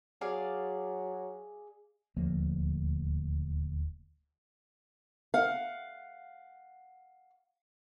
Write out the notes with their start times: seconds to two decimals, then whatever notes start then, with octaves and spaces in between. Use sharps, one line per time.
0.21 F#3 G#4 D5 F5
2.17 D#1 D2 F3 A#3
5.34 F5 F#5